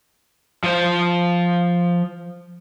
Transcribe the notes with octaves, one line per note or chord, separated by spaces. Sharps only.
F3 C5